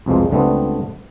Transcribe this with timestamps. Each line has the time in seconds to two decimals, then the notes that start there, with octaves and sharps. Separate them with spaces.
0.06 C2 F2 B2 F3 G#3
0.31 C#2 D3 G3 A3 B3 C4